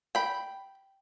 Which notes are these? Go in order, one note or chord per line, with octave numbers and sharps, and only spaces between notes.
G5 B5